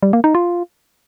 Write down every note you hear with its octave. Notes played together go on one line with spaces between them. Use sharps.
G3
A#3
D#4
F4